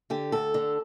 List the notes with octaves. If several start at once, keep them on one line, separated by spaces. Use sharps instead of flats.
D3 G4
D2 A4
D3